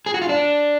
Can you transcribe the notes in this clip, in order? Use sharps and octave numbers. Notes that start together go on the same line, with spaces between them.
G#4
F#4
F4
D4